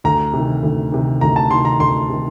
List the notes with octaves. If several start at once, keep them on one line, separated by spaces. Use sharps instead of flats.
D2 A#5
C3 D#3
D2
C3 D#3
D2 A#5
A5
C3 D#3 C6
A#5
D2 C6
C3 D#3